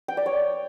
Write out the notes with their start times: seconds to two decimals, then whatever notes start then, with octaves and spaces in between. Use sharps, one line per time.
0.08 G5
0.17 D5
0.26 C#5